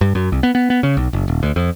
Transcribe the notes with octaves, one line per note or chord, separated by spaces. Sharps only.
G2
F#2
C2
B3
B3
B3
C#3
B1
F#1
D#1
D2
F2